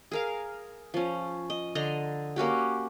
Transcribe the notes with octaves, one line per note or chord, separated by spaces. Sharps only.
G#4 A#4 F5
F3 C#4
D#5
D3 D#5 A#5 C6
A#3 C#4 F#4 G4